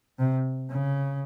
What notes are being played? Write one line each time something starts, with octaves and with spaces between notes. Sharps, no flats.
C3
C#3